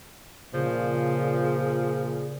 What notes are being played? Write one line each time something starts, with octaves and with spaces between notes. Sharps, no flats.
A#2 C#3 F3 C#4 G#4